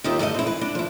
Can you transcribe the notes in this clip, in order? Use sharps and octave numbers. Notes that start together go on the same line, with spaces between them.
D#2 A#3 D#4 F4 G4 E5
G2 D3 A3 D#5
C4 E4
E3 B4
D4 F#5
F3 E4